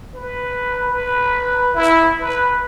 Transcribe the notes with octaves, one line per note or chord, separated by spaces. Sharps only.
B4
B4
E4
B4